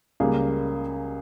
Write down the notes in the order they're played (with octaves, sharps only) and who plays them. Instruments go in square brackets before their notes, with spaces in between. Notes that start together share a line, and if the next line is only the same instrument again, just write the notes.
[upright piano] C#2 C#3 G3 A#3 G#4